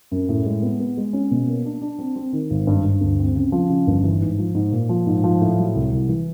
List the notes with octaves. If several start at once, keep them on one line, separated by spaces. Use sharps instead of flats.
F#2
A2
G#3
B3
B3
G#3
C#4
B2
A#3
D4
D4
C4
C4
D#3
G#1
G2
G2
D2
C4
C#3
F3
C#3
G1
E3
G#2
F3
G#2
A#2
F3
G#2
F3
A2
F#3
C2
C2
E3